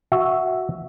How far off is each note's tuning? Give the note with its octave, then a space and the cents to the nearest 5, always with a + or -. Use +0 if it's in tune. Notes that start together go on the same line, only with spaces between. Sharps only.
F#4 +0 E5 -5